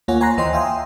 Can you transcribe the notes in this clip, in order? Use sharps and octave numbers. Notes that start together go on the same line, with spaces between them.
D#2 A#3 F4 C#5 F#5 G#5
C#5 G#5 A#5 C6 F#6 A#6
D2 E3 C5 D#5 G5 C6
E5 F5 G5 G#5 C6 D#6